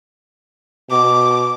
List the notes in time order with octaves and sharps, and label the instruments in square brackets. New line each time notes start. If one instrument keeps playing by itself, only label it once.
[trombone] B2 [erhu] D6